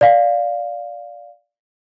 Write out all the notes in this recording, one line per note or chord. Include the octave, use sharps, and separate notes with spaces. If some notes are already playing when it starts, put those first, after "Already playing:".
D5 F5